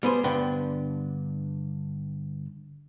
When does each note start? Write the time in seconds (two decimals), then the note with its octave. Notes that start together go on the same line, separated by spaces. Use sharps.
0.03 G3 B3 G#4 C5
0.24 G2 D3 B3 D4 D5 G5